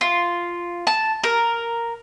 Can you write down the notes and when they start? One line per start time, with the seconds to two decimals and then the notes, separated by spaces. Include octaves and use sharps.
0.01 F4
0.87 A5
1.24 A#4